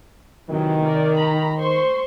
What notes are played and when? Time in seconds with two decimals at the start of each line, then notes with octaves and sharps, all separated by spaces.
0.50 C3 D#3 E3 F#3
0.84 A#4 D5
1.17 A#5 B5
1.59 C5 C6 C#6